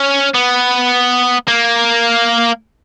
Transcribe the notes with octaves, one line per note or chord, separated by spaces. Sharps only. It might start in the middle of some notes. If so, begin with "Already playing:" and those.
Already playing: C#4
B3
A#3